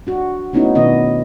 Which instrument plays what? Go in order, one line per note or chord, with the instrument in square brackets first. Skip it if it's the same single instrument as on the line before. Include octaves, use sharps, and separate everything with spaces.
[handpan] D4 F#4
A3 B3 C#4 D#4 E4 F#4
B2 D#3 B3 D4 D#5